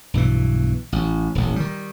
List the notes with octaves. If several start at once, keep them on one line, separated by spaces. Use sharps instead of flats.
B1 G2 B2 E3
A1
D#1 A1
D#3 G3